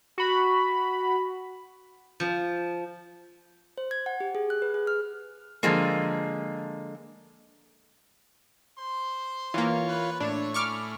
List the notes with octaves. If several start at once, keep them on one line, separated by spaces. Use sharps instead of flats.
F#4 B5
F3
C5
G#6
F#5
G4
G#4
F#6
B4
G#4
F6
D3 F3 G#3 A#3
C5 C6
E3 A#3 F4 C#5
B4
A2 D4 C#5
C#4 B5 C#6 D6 F6